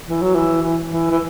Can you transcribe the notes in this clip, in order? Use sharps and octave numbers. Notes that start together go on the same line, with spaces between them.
E3
F#3
E3
E3
E3
E3